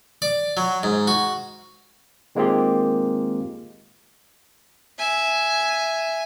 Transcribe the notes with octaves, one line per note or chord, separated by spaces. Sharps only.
D5
F#3
G#2
F#4
D#3 G#3 A#3 C4 F4 G4
E5 G#5